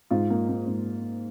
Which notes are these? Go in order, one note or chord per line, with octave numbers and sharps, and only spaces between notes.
G#2 F4
A#3
A#3
G#2